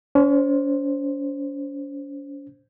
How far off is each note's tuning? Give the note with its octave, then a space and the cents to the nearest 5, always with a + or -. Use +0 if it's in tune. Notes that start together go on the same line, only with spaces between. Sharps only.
C#4 +40 C5 +0